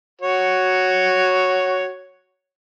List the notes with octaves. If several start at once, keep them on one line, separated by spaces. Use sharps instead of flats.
F#4 C#5